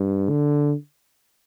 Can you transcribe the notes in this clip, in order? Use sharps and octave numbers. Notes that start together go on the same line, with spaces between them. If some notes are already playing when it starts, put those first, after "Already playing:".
Already playing: G2
D3